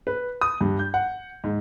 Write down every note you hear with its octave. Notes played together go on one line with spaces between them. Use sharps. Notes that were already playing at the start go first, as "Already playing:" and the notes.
B4
D#6
G2
G6
F#5
G#2